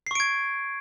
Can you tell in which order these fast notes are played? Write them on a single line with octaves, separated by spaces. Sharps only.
C7 C#6 D7 G#6